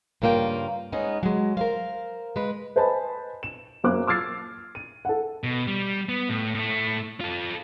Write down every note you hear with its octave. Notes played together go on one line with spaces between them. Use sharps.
G2 C#3 A#3 F4 G5
G#3 B3 C#4 D#4 G#4
F#3 G#3
A#4 C5 F5
G#3 B4
B4 C5 D#5 G#5 A5 B5
E7
F#2 A#3 C5 D6 F#6
D6 E6 F6 G#6 A6 C7
D#7
A4 F#5
B2
G3
B3
A2
A2 A3
F4 A4